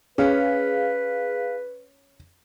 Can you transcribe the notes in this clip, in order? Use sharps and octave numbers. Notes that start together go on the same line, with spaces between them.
C#4 G#4 B4 F5